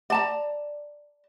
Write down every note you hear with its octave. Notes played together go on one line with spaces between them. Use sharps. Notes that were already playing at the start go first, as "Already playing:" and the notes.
D5 A5 A#5